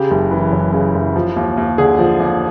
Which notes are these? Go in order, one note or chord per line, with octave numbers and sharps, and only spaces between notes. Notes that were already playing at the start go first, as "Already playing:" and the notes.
Already playing: C#3 G4
F#1
E3
F#2
C#3
F#1
F3
D#2
D#2
D3 G#4
F3
D#2